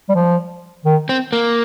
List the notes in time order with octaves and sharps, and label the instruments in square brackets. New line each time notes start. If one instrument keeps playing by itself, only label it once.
[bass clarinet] G3
F3
D#3
[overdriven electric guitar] C4
A#3